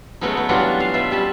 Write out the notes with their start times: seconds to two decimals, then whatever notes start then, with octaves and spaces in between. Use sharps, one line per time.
0.21 F#3 G#3 A3 B3 C#4 D#4
0.37 B3
0.49 E3 F#3 G3 D4 F4 F#4
0.80 F4 F5 A5
0.94 B2 F4 E5 B5 C6
1.11 G3 C#4 A5 B5